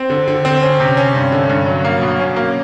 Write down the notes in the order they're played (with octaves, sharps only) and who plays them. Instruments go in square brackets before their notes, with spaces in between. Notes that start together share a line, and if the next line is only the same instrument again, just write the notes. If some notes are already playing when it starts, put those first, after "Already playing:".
Already playing: [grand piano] C4
D3
D3
C4
C#4
C3
C#4
G2
D3
G2
F#3
A#3
B2
C#4
A#3